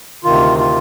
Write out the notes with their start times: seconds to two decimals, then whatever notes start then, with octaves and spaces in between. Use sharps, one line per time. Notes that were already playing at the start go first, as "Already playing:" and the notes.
0.24 D2 C3 D#3 F4
0.58 F4